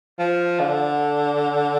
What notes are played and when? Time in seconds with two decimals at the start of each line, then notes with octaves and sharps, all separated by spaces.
0.19 F3
0.60 D3